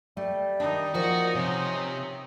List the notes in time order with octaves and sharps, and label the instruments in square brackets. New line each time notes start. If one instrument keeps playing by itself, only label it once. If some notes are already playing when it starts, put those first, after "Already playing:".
[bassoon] G3 [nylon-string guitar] A3
[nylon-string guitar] D#3 D4 [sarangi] D#4
[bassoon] A#2 [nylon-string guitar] F3 [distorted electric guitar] F#4
[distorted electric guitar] C3 [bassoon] C#4